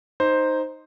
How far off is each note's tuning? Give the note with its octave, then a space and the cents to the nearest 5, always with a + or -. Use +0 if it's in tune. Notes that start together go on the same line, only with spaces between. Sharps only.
D#4 +0 C5 +0